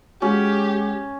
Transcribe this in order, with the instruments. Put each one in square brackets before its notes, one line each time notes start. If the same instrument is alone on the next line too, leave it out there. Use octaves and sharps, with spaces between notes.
[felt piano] G#3 F#4 [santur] C#4 [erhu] G4